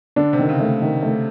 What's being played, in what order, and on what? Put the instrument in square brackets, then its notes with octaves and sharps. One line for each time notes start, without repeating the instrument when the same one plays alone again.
[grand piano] D3 [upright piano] D4
[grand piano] C3
[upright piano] D#3
[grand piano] C#3
[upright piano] A3
D#3
A3